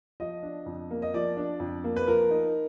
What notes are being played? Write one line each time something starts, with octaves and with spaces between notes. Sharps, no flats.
F3 D#5
D4
F2
A#3
D#5
F3 D5
D4
F2
A#3
B4
F3 A#4
D#4